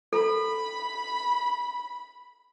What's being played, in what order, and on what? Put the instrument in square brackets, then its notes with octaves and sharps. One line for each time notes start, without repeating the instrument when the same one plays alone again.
[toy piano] A4 [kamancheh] B5